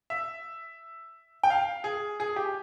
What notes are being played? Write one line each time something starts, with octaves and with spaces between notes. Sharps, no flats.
E5
G5
F5
G#4
G#4
G4